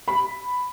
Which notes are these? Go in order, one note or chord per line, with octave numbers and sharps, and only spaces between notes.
B5